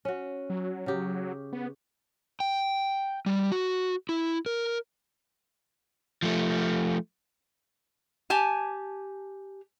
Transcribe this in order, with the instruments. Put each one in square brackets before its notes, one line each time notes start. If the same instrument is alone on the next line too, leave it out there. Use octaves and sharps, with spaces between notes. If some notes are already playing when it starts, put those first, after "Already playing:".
[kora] C#4 F#4
[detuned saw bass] F#3
[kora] C#3 G4
[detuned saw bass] B3
[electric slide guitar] G5
G3
F#4
E4
A#4
[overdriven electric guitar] F3 A3
[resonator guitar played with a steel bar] G4 G#5 A5